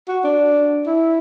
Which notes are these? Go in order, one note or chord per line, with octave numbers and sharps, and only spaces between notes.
F#4
D4
E4